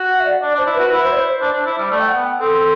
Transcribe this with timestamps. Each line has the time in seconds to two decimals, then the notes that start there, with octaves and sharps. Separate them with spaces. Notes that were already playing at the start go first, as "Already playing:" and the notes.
Already playing: F#4
0.09 F#5
0.20 E5
0.25 D5
0.42 D4 D5
0.55 D4 C5
0.66 E4
0.74 F#4 B4
0.91 E4 B4
1.04 C5
1.13 D5
1.16 C5
1.29 C5
1.42 D4
1.53 D4
1.66 E4
1.78 G3
1.90 A3 D5
2.00 G5
2.07 F#5
2.15 B3
2.24 G5
2.40 C4 A4